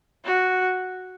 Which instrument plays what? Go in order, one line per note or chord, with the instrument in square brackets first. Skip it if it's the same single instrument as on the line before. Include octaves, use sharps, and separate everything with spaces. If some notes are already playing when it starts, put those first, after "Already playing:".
[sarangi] F#4